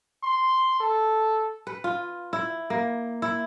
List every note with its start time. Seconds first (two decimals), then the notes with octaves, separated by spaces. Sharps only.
0.23 C6
0.80 A4
1.67 B4
1.84 F4
2.33 E4
2.70 A#3
3.22 E4